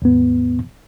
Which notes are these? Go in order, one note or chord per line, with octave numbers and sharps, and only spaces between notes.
D#2 G#2 B3